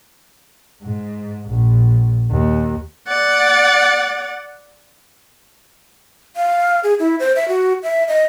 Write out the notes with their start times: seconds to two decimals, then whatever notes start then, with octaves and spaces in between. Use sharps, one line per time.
0.83 G#2
1.49 A#1
2.31 D#2
3.07 D5 F#5
6.36 F5
6.84 G#4
7.00 E4
7.20 C5
7.36 E5
7.48 F#4
7.83 E5
8.08 D#5